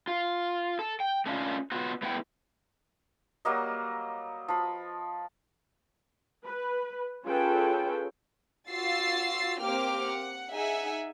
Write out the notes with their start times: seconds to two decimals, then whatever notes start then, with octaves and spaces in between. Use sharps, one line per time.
0.07 F4
0.79 A4
1.00 G5
1.26 A3 C#4 D4 E4 F4
1.72 B3 F4 F#4
2.02 A3 B3 E4 F#5 G5
3.45 F#3 G3 A#3 D#5
4.48 F3 B5
6.46 B4
7.26 C#4 F4 G#4 A4 B4 G5
8.69 F4 F#4 E6 A6 C7
9.60 A#3 C4 G4 G5 D6 F6
10.03 F#5
10.51 D#4 G#4 E5 F#5 G#5